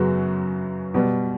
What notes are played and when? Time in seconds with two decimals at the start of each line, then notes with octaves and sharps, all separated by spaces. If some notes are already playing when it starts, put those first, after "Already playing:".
Already playing: F#2 C#3 F#3 B3 F#4
0.94 B2 G3 B3